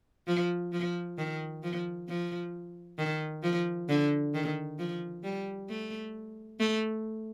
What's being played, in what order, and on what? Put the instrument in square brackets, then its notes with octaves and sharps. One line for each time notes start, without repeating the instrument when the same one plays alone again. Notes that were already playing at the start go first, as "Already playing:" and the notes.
[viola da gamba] F3
F3
D#3
F3
F3
D#3
F3
D3
D#3
F3
G3
A3
A3